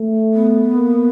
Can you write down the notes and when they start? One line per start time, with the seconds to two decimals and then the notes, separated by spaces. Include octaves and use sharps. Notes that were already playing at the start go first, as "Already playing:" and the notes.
Already playing: A3
0.34 B3
0.75 A#3